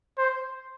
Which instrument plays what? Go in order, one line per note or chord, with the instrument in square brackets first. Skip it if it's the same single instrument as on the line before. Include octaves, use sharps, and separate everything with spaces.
[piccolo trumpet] C5